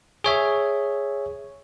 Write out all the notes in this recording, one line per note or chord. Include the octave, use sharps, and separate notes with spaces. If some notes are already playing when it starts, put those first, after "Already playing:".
G#4 C#5 E5